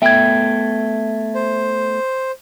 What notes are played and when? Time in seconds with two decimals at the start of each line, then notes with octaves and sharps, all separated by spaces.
0.02 A3 B3 E5 G5 G#6
1.35 C5